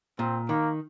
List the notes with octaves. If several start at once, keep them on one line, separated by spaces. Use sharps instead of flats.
A#2 C4
D#3 A#3